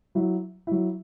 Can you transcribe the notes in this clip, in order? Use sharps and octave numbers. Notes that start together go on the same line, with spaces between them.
F#3 E4
F#3 E4